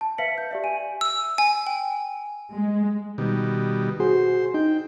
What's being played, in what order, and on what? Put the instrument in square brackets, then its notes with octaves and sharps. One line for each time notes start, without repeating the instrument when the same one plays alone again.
[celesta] A5
B4 E5 F5 B6 C#7 F#7
G6
G4 D5 E5
G#5 D#7
[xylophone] E6
G#5
G5
[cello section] G#3
[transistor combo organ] B2 D#3 G3
[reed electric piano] F#4 G#4 [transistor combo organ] C5
[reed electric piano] D#4 [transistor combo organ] G5